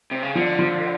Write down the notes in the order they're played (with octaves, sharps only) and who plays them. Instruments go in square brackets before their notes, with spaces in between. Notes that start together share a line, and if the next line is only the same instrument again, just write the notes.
[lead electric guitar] C3
C#3
[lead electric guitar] D3 [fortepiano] F3
[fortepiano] F3